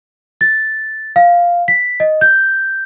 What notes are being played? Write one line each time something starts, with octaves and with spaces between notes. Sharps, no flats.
A6
F5
B6
D#5
G6